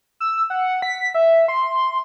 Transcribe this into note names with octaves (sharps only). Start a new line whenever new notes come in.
E6
F#5
B6
E5
C6